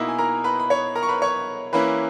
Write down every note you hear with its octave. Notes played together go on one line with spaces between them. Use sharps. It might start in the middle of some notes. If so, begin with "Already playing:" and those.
Already playing: B2 A#3 D#4 E4 D#5 E5
G#5
A#4 A#5
B4 B5
B5
C#5 C#6
A#4 A#5
C#6
B4 B5
C#5 C#6
E3 A#3 C#4 E4 B4 B5